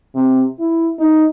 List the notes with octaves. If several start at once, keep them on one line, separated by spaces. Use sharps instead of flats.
C3
E4
D#4